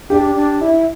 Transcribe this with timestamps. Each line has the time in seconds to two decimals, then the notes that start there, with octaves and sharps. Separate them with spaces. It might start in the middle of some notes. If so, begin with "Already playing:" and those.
0.10 D4 G4
0.35 D4
0.61 E4